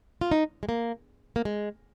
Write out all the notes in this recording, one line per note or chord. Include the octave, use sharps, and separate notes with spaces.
F4
D#4
G#3
A#3
A#3
G#3